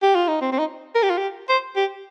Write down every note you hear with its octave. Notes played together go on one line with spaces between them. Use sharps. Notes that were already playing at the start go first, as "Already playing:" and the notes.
G4
F4
D#4
C4
C4
D#4
A#4
G4
F4
G4
C5
G4